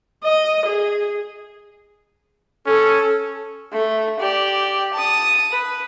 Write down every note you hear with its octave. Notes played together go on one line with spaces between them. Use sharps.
D#5
G#4
C#4 A4
A3
G4 D5
A5 D#6
B4